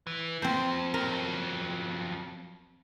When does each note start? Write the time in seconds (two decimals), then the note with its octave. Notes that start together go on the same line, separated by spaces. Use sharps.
0.07 E3
0.42 F2 C4 C5
0.94 F2 F#3 A#4